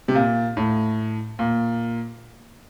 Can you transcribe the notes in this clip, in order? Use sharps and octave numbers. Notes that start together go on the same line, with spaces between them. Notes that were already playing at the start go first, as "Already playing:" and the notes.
C3
A#2
A2
A#2